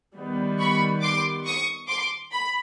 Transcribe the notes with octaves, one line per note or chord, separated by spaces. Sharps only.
D#3 G3 B3
B5 C#6
C6 D6
C#6 D#6
C6 D6
B5